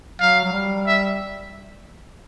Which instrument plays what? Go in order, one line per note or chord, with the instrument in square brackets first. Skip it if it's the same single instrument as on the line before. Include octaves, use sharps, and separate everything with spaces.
[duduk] F#3 [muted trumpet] F5
[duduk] F#3
G3
[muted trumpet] E5